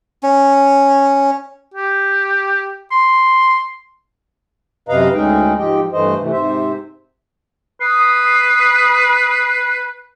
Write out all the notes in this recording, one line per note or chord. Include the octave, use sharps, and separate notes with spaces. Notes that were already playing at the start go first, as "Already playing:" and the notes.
C#4
G4
C6
F#2 C3 B4 D#5 F5 A#5
D2 G#3 C#4 D#4 G#4 G5
G#2 F3 G4 D#5 G5
G2 E3 A3 C5 D#5
C3 E3 A3
G#2 C3 C5 E5
B4 D#6 C7